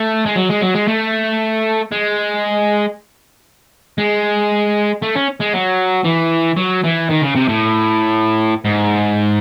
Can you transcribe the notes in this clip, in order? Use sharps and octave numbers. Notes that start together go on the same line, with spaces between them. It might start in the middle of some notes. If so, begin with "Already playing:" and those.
Already playing: A3
G#3
F#3
G#3
F#3
G#3
A3
G#3
G#3
A3
C#4
G#3
F#3
E3
F#3
E3
D#3
C#3
C3
A2
G#2